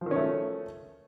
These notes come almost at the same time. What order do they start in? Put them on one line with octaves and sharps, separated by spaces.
F3 D#3 C#4 A3